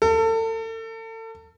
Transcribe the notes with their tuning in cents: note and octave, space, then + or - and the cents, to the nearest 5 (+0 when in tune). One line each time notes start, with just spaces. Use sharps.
A4 +35